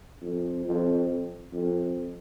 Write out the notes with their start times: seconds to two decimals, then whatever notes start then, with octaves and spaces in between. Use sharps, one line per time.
0.22 F2
0.66 F2
1.53 F2